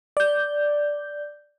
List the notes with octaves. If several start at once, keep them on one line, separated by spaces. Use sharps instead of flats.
D5 G6